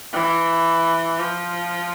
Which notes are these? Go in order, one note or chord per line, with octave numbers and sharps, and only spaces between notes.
E3
F3